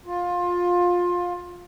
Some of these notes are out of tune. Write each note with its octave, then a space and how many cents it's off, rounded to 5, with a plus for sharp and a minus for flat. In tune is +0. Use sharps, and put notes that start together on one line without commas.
F4 +20